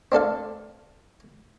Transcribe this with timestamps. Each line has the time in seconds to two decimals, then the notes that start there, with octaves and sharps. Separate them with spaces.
0.12 C4 D4 A4 F5